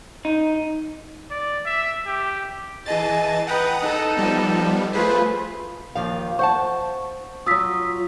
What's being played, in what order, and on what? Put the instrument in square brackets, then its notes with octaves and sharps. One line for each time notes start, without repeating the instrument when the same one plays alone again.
[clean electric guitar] D#4
[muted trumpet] D5
E5
G4
[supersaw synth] E3 A5 A6 [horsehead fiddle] G#4 D#5
[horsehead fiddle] B4 G5 [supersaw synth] F#5 A#5 D#6
[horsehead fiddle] D#4 A4
[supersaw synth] F3 G3 B3
[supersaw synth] A3 G#4 C5 [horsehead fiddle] F4 B4
[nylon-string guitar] D#2 F3 F5
[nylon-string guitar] C5 F#5 A5 [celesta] C#6
[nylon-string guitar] F#3 F4 [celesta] D#6 E6 B6